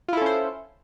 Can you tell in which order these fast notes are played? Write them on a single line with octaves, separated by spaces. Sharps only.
F4 E4 A4 C#4 C5